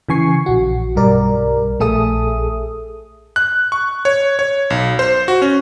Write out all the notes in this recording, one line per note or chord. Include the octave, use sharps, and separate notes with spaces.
C#3 E3 G#5 C#6 C7
A#1 F#4
B1 G2 G3 A#4 D5
A#1 A3 G#4 A4 E5 D#6
F#6
C#6
C#5
C#5
B1
C5
F#4
C#4